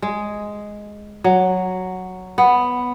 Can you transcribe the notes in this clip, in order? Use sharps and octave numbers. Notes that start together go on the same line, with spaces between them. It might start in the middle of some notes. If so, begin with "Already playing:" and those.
G#3
F#3
B3